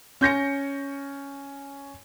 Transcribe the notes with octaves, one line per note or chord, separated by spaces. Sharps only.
C#4 G6 A#6 C#7